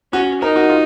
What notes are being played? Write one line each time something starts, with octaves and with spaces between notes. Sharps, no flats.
C#4 F#4
D#4 A#4
F#4
F4